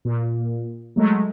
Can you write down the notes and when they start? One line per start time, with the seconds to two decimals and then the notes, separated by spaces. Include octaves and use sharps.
0.05 A#2
0.96 F#3 G#3 A3